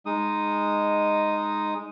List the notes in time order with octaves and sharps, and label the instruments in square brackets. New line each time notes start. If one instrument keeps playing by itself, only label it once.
[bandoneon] G#3 D#4 D#6